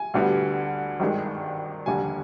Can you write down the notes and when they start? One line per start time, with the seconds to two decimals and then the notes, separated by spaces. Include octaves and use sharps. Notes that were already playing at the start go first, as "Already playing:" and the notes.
Already playing: G#5
0.14 D2 D3 G3 B3
1.00 G#1 G2 D#3 G#3
1.86 F1 D#2 D3 G3 G#5